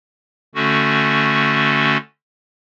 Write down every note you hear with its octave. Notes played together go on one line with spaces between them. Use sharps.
D3 A3 C#4 F#4